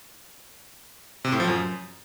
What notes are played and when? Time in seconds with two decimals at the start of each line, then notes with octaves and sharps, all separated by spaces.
1.25 C3
1.32 A2
1.40 F3
1.47 F#2